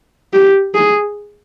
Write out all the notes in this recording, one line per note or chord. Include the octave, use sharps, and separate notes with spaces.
G4
G#4